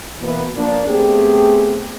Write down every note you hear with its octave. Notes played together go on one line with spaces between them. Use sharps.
B2 E3 A#3 B3
F3 A#3 D4
A3 B3 C4 G4 G#4